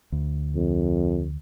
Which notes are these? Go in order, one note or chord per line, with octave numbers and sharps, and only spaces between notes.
D2
F2